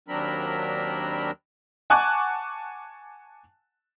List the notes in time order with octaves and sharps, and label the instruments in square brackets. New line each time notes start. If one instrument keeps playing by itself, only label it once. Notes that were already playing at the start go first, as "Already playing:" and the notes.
[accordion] D#2 F#3 C4 D4 A#4 B5
[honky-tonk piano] F#5 G#5 A5 C#6 D6 F#6